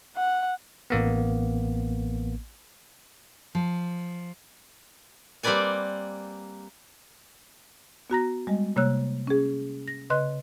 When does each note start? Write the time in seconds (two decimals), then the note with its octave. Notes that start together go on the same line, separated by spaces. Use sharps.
0.17 F#5
0.90 A1 A#3 B3
3.55 F3
5.43 G3 A#3 C4 B4 D5 G#5
8.10 B3 F#4 A#5 A#6
8.47 G3 G#3 D#5
8.76 C3 G3 A#3 C#5 E6 F#6
9.27 C#4 G#4
9.88 A#6
10.10 C#3 B4 D#5 C6 F#6